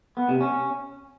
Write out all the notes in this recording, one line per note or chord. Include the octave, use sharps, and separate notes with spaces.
B3
C3
C#4